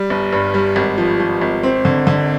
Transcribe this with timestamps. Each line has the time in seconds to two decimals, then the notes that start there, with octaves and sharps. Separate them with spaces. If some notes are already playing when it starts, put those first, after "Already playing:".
Already playing: G3
0.10 G1
0.32 G2
0.54 G3
0.76 G#1
0.98 F3
1.20 F3
1.42 G#1
1.63 C4
1.85 D3
2.07 D3